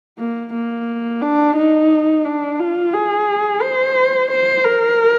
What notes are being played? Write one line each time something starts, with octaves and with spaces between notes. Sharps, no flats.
A#3
A#3
D4
D#4
D4
F4
G#4
C5
C5
A#4